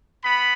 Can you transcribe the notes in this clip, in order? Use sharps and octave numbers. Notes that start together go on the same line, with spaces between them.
B3 B5